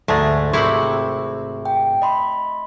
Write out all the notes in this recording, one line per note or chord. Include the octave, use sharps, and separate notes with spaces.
D2 G#2 G#3 A3
G#1 C3 C4 E4 F#5 C#6
G5
D#5 B5 C6